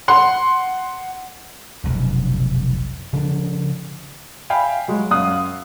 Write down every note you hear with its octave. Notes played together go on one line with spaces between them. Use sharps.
F#5 C6
F1 B1 F#2
C#3 F3 D4
E5 F5 G5 G#5 B5
F#3 G#3
F#2 F#3 F5 D#6 F#6